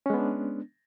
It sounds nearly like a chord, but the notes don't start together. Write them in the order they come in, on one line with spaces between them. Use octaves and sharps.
C#4 G#3 B3 D4